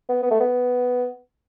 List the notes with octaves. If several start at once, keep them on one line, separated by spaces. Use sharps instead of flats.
B3
B3
A3
B3